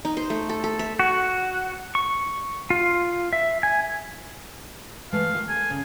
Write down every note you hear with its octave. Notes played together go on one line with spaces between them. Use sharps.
D#4
C5
A3
A4
A4
E5
F#4
C#6
F4
E5
G#5
E3 G#3 A3 F5
D#3 F4
A4 G#5
C#3